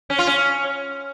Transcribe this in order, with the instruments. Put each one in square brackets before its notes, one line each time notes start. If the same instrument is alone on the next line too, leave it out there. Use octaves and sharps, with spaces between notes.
[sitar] C#4
F4
C#4